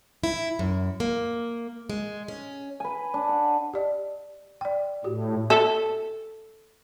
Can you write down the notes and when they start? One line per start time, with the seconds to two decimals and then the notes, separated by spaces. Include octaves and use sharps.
0.24 E4
0.59 F#2
1.00 A#3
1.90 G#3
2.28 C#4
2.80 B4 G#5
3.14 D4
3.29 F#5
3.73 G4 D5 D#5
4.61 D5 G5
5.04 A2 F#4 G4
5.50 A4 E5